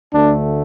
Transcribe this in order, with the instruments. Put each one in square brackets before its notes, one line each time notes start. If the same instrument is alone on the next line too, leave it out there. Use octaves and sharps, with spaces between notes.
[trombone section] D2 D3 A3 D4